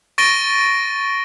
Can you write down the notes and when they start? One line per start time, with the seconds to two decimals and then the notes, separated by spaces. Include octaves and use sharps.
0.18 C#6 A6 A#6 D7 D#7 G7